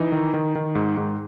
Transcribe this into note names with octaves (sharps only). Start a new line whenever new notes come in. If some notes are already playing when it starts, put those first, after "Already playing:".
Already playing: E3 D#4
D#3
D#3
D#3
G#2
G#2